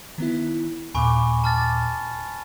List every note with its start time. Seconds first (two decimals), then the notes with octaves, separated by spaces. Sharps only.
0.18 D#3 B3 E4
0.95 D#2 A#2 G#5 B5 C#6 D6
1.44 A5 F6 A6